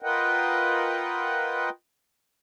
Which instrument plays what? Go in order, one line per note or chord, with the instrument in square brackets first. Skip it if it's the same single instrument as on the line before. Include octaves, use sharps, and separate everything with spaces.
[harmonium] F4 A#4 B4 D#5 F#5 G5